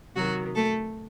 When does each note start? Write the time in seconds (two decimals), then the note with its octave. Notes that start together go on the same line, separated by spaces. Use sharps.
0.16 C3 D#3 F#3 F#4
0.55 A3 A4